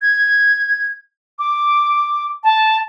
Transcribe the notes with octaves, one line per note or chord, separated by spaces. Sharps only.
G#6
D6
A5